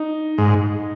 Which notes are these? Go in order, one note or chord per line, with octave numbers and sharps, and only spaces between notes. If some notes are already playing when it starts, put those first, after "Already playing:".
Already playing: D#4
G#2